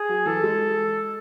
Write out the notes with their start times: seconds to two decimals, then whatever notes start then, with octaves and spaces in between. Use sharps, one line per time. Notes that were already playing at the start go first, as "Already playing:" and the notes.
Already playing: G#4
0.09 F#3
0.26 E3 A4
0.43 G#3